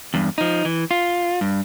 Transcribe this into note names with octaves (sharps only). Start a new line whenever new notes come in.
E2 G2
F3 D#4
E3
F4
G2